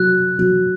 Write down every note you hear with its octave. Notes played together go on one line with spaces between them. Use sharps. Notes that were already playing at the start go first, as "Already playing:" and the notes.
Already playing: F#3 F#6
F#3